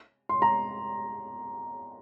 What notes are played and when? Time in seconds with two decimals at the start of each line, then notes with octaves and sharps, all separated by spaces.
0.29 C6
0.42 A#5